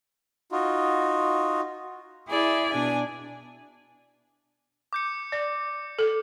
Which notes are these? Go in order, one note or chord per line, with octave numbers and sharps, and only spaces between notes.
D#4 F4 F#4
E4 G#4 D5 E5
B2 D4 G#5
D6 G6 C#7
D5
A4